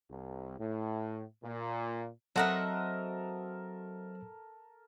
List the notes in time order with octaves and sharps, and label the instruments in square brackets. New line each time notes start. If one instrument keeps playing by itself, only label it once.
[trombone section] C2
A2
A#2
[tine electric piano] F#3 [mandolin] C4 F#5 [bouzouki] F#4 D#5 E5 [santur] A4 A#4